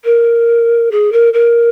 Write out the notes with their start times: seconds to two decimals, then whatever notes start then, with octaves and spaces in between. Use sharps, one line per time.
0.04 A#4
0.91 G#4
1.12 A#4
1.33 A#4